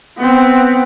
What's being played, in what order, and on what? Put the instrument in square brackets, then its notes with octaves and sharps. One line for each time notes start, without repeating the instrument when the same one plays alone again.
[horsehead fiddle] B3 C4